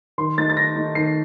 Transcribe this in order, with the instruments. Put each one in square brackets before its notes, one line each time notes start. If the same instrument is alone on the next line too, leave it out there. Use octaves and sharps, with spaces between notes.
[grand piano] D#3 C6
A3 D#4 A6
A6
D#3 A#6
A3 D#4
D#3 C7